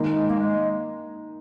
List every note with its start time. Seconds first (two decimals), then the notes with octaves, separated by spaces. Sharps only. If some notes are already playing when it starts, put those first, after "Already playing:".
Already playing: D#3 G#3 A#3 D#4
0.28 A#3
0.40 G#3